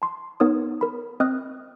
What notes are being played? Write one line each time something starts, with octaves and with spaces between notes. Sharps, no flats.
A5 C6
B3 D#4 A#4 C#5 D#6
A#4 B5
C4 D#5 D#6 F6 F#6